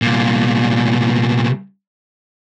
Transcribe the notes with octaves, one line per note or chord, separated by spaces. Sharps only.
C2 A#2